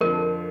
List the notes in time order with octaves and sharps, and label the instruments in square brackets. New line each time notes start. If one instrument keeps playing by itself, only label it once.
[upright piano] F2 D3 F3 [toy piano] A#4